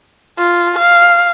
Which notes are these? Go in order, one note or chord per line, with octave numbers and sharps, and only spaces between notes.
F4
F5